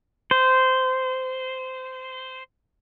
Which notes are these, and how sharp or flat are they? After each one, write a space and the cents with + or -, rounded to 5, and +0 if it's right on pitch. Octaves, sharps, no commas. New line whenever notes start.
C5 -15